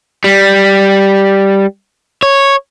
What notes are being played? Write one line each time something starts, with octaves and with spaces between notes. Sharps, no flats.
G3
C#5